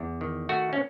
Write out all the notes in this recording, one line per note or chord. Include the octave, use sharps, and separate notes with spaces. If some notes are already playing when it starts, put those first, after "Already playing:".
Already playing: E2
D#3
A3 F#4
C#4